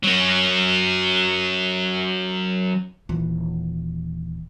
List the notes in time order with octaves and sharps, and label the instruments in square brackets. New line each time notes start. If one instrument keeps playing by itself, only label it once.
[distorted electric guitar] F#3 C#4
[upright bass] D#1 E3